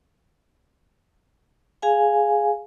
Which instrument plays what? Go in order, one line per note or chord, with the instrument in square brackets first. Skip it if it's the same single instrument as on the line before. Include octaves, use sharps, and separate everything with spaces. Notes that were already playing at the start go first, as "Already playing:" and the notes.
[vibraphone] G#4 F5 G#5